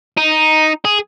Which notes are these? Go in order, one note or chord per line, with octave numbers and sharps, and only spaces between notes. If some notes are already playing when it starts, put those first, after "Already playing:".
D#4
G#4